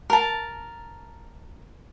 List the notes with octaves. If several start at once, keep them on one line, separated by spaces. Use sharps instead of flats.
A#4 A5